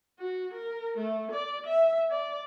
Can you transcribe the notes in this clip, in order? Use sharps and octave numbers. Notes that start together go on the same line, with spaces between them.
F#4
A#4
A3
D5
E5
D5